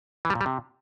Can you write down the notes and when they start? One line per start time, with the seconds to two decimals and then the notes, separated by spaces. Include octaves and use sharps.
0.25 E3
0.30 G3
0.35 A#2
0.41 G3
0.46 C3